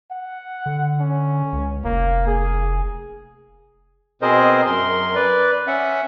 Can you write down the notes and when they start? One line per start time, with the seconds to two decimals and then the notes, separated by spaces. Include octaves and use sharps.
0.11 F#5
0.66 D3
1.00 C#4
1.53 C#2
1.85 F1 A#3
2.27 G#4
4.22 B2 C4 G#4 A#4 C5 D#5
4.67 F#2 A#4 C6
5.15 B4 D5
5.67 C#4 E5 F#5